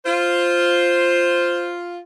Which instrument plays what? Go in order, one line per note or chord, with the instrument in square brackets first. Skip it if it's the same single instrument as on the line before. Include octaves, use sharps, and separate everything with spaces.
[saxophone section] F4 [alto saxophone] C5